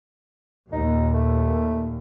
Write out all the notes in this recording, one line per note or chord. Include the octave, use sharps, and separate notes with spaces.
D#2 A#2 D#4
A3